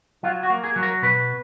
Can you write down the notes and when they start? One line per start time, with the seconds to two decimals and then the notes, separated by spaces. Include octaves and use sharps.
0.23 F#3 F4
0.43 F#4
0.50 A#3
0.64 G#4
0.76 F#3
0.83 A#4
1.02 B2 B4